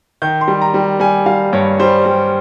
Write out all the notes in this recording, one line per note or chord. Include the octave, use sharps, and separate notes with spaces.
D#3 G6
C6
G3
A#5
G3
G3 G#5
G3 F5
G2 C#5
G3 C5
G3